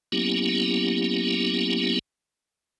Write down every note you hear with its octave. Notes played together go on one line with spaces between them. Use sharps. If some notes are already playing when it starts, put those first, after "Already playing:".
F#3 A#3 B3 C#4 E4 G4